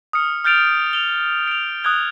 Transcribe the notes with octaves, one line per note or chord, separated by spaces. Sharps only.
D#6 F6 C#7
F6 G6 A6 D7 F7
F7 G7
D7 F7
D#6 F#6 G#6 G7